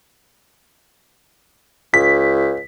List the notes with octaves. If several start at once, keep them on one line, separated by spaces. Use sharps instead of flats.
C#2 B6